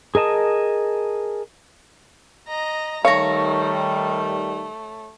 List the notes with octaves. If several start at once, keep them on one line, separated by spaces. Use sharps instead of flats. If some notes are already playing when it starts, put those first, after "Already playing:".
G#4 A#4 D#5 A5 D#6
D#5 A#5
D#3 G3 A3 C#5 F5 A#5